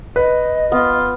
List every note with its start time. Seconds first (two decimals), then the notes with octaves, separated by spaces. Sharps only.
0.16 B4 D#5
0.72 B3 F4